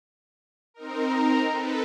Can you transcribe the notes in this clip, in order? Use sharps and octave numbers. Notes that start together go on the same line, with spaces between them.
C4 D#4 A#4
A#5
A4 B4